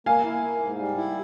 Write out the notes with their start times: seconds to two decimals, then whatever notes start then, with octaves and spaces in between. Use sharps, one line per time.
0.06 A#3 F5 G#5
0.25 E4
0.42 A#3
0.61 G#2
0.79 G3
0.97 E4